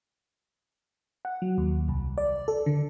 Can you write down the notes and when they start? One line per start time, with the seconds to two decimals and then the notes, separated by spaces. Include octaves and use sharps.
1.25 F#5
1.42 F#3
1.58 D#2
1.89 C2
2.18 D5
2.48 A4
2.66 D3